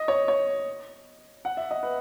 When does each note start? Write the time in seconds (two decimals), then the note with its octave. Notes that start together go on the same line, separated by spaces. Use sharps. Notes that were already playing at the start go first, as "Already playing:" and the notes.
Already playing: D#5
0.08 C#5
0.28 C#5
1.45 F#5
1.57 E5
1.71 D#5
1.83 B4